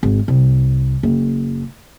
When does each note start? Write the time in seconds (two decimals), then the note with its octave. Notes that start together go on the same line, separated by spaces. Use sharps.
0.03 G#1
0.28 C2
1.03 F#1